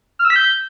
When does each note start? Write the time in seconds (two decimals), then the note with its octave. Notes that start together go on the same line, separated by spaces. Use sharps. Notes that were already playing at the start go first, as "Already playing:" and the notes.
0.19 F6
0.25 E6
0.30 B6
0.36 G6